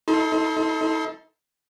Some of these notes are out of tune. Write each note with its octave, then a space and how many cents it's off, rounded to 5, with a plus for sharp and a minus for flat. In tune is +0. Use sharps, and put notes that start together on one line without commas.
D#4 +45 A4 +0 C6 +0